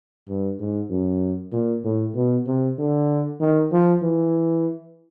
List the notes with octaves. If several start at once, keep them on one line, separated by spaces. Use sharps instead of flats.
G2
G#2
F#2
A#2
A2
B2
C3
D3
D#3
F3
E3